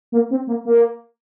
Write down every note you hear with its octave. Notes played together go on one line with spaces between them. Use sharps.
A#3
C4
A#3
A#3